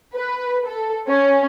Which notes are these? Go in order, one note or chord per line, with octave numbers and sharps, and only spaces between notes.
B4
A4
C#4